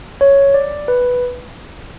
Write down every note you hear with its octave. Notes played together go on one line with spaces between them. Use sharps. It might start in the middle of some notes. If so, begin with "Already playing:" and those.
C#5
D5
B4